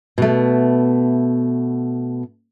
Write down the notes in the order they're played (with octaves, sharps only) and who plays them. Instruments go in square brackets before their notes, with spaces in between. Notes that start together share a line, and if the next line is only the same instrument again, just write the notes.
[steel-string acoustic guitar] B2 A3